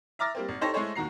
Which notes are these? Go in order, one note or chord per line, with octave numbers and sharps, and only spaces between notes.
E5 A#5 D6 F6 A6 A#6
G3 A#3 C4
G#1
D#4 G4 A4 C5 C#5 A#6
G#3 A3 E4 G#4 C5 C#5
D#2 D#3 F#4 A#5 C7